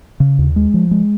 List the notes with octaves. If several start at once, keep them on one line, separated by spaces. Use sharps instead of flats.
C#3
D#2
G#3
F3
G#3